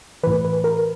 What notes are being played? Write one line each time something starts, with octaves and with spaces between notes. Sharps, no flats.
A2 E3 B4
B4
A#4